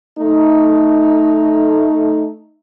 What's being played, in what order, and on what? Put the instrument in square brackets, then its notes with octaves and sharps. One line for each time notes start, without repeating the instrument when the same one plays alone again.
[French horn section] A3 D#4